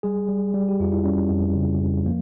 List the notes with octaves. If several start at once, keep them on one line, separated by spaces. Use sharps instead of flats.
G3 G#4
G3
G3
G4
F2 F4
E4
G3 C#4
F2
C#3
F2
F3 A#3